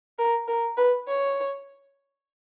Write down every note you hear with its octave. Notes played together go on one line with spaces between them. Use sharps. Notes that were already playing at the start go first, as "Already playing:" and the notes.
A#4
A#4
B4
C#5